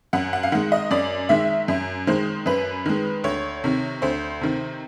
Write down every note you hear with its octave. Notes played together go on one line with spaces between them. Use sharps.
F#2 F#5
F#5
F5
D#3 G#3 F#5
D#5
F#2 D5
D#3 G#3 E5
F#2
D#3 G#3 C5
F#2 B4
D#3 G#3
D2 C#5
C3 D#3
D2 C5
C3 D#3